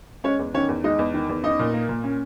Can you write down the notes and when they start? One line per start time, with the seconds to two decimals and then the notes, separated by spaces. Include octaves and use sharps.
0.24 G#3 C#4 C#5
0.39 E2
0.54 D#3 C#4 C#5
0.69 E2
0.84 G#3 D#4 D#5
0.99 E2
1.14 D#3
1.29 E2
1.44 C#4 D#4 D#5
1.59 A#2
1.73 A#3
1.89 A#2
2.04 C#4